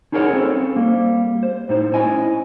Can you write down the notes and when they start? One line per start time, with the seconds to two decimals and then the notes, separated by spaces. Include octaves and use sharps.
0.12 C#4 D#4 G#4 A#4 C#5 F#5
0.33 C4 C#4 A4 C5
0.76 G3 A#3
1.43 C5
1.69 A2 D#4 C5
1.94 C#4 E4 D#5 G#5